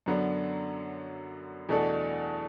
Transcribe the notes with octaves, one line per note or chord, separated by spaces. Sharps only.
F#2 D3 F#3 B3 D4
E2 B2 A3 D4 A4